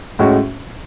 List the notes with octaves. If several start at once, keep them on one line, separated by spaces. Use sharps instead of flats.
A2 G#3 C#4 F#4